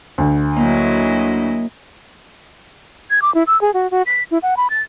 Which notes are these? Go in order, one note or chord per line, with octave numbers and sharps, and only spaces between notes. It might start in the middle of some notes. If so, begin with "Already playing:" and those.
D2
F#3 A#3 E4 D#5
G#6
D6
E4
E6
G#4
F#4
F#4
B6
E4
F#5
B5
A6